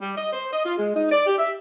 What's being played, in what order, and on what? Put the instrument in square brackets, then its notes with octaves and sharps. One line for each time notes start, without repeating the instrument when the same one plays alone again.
[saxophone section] G3
D#5
C5
D#5
F4
G#3
D#4
D5
G4
E5